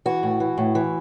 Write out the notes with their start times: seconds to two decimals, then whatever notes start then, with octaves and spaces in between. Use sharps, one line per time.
0.05 E3 F#4
0.23 A2
0.40 E3
0.58 A2
0.75 E3